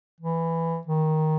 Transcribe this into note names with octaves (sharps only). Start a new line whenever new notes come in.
E3
D#3